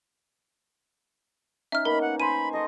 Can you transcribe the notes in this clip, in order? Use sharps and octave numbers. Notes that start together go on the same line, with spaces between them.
C#4 D#4 E5 F6
A#3 B3 D#4 A#4 B5
F#5
C5 G#5 B5 D#7
A4 C5 D#5 C#6